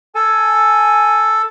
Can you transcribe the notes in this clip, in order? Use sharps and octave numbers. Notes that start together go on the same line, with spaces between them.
A4 G#5